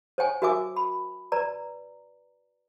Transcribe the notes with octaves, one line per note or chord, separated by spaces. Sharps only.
C5 C#5 G5 G#5
F#4 A#4 E5 G#5 D6
B5
B4 D5 A#5